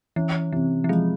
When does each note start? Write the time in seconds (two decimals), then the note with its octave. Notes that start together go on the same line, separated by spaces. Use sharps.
0.16 E3 C#4
0.52 C3 E3
0.84 E3
0.89 F3 G#3